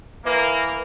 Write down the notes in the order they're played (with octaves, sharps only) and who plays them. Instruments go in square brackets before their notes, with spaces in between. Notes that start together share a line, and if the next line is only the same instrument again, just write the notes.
[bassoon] E3 [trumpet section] A#3